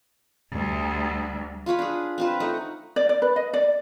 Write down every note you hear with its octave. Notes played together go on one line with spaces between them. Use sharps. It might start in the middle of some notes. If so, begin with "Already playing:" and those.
D2 G3
F4 B4 C#5 B5
D4 G#4
C4 F4 B4
A3 D#4 F#5
D5
D5
B4
D#5
D5